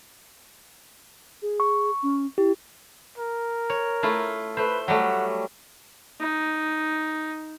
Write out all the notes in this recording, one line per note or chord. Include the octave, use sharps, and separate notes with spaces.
G#4
C#6
C#4
E4 G4
A#4
C#5
A3 E4 F4
A3 B4 C5
F#3 G3 A3 F#5
D#4